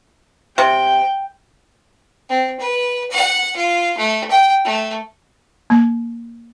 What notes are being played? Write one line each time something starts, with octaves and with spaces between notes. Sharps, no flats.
C3 G5
C4
B4
F#5
F4
A3
G5
A3
A#3